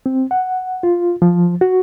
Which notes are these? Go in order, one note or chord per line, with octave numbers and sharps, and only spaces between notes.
C4
F#5
F4
F3
F#4